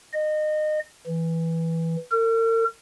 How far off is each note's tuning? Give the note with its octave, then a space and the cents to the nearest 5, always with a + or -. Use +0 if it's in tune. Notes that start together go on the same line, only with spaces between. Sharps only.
D#5 -25
E3 -5
A#4 -45